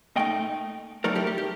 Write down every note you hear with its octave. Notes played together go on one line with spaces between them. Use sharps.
A#2 A3 D#4 D#5 G5
F#3 A3 D#4 A#4 D5
G4 A#4
G4
G4